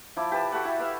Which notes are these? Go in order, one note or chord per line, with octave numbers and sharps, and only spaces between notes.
F3 E4 D6
G4 B4 A5
F#4 G4 A4 F#5
E4
F#4 B4 E5 F5